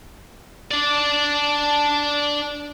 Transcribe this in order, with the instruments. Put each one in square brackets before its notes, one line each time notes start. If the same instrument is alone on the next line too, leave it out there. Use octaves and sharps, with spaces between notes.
[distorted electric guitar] D4 D5